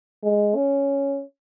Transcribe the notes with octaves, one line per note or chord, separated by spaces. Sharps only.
G#3
C#4